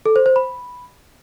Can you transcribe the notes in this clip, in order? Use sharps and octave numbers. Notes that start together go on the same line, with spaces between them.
A4
C5
C5
B5